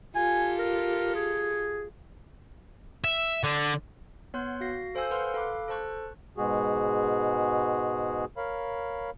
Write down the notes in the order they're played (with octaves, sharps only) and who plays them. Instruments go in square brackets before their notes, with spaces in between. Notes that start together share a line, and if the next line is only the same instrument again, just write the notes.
[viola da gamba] F4 G4 A4 [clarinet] G#5
[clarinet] A#4
G#4
[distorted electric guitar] E5
D3
[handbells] B3 C#5 F#5 C6 F#6 G6
F#4 F5 A#6 C7
A4 C5 F5 G#5 E6 G6
A4 B4 F5 F#5 C6 F6
A4 F5 B5 D6 F#6
A4 C5 A5 C#6 F#6
[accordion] G#2 B2 G#3 F#4 G#4
A#4 C#5 F5 B5